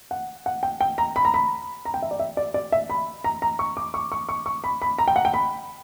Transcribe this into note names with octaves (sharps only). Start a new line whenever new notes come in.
F#5
F#5
G5
G5
A#5
B5
A#5
B5
A#5
G5
E5
D5
E5
D5
D5
E5
B5
A#5
A#5
C#6
D6
C#6
C#6
C#6
C#6
B5
B5
A#5
G5
F#5
G5
B5